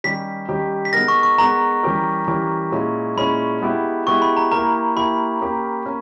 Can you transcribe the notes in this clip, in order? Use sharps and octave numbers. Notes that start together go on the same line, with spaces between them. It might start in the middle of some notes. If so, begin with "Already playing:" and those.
D#3 G3 C#4 G4 B6
D#3 G3 C#4 G4
B6
G#3 B3 D#4 A#4 A#6
C#6
C#6
G#3 B3 D#4 A#4 A#5
E3 G3 C#4 G4 A#4
E3 G3 C#4 G4 A#4
A#2 G#3 C#4 E4
A#2 G#3 C#4 E4 B5
G#3 B3 E4 G4
G#3 B3 E4 G4 C#6
B5
A#5
A#3 E4 G4 A#4 A#5
A#3 E4 G4 A#4 B5
A#3 C#4 G4 A#4
A#3 C#4 A#4